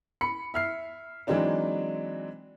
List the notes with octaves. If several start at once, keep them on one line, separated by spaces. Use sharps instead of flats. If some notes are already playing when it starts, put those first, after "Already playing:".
B5 C#7
E5 F6 C7
E3 F#3 G#3 C4 D4 D#4